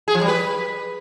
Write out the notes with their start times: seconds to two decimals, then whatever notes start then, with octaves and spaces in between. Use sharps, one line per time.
0.08 G#4
0.14 F3
0.21 G3
0.28 B4